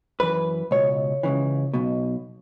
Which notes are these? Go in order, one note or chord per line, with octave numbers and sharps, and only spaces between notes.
F#2 E3 B4
C#2 B2 C#5
C#2 C#3 E3
B1 B2